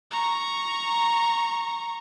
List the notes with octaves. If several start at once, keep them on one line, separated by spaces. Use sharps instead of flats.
A#5 C#6